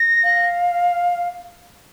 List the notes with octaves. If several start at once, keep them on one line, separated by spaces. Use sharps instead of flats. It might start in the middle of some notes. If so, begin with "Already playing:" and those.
Already playing: A#6
F5